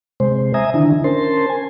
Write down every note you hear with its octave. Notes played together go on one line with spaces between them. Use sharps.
C3 G#3 C5
E5 G#5 A#5 D#6
D3 D#3 D4 E4
C#4 A#4 C5 A5 C6
G#5